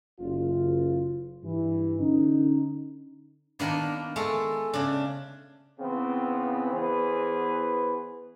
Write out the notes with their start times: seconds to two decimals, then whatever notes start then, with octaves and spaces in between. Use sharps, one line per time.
0.20 F#1 F4
1.44 G2 E3
1.99 D3 C#4 D#4
3.60 D#3 A#3 B3 D4
4.16 G#3 A3 A4
4.73 C#3 D4
5.80 C#3 E3 B3 C4
6.73 E2 E3 B3 G#4 B4 C5